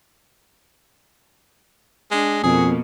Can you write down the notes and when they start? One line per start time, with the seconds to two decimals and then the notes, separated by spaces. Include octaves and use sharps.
2.11 G#3 D4
2.43 F2 B2 A#3 G#4